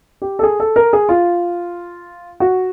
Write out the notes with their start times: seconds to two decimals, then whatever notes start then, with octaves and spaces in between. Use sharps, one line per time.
0.22 G4
0.39 A4
0.43 G#4
0.60 A4
0.76 A#4
0.93 G#4
1.09 F4
2.40 F#4